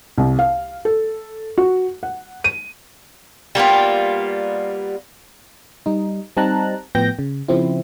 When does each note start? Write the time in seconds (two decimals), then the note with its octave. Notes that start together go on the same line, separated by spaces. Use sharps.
0.18 C2
0.39 F5
0.85 A4
1.58 F#4
2.03 F#5
2.44 D#7
3.55 G3 A#3 B3 F4
5.86 G3 D#4
6.37 G3 C4 D#4 A5 A#5 F#6
6.95 A2 F3 B3 G5 G6 A#6
7.19 C#3
7.48 C#3 F3 C4 E4